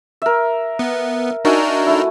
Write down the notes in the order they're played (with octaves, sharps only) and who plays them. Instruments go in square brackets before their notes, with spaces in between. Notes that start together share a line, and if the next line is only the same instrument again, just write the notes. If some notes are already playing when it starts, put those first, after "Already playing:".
[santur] A#4 E5
[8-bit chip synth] B3
[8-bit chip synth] D4 D#4 A#4 [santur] F#4 E5 G#5
[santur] A3 E4